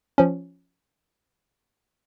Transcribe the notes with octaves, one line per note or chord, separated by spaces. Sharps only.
F3 C#4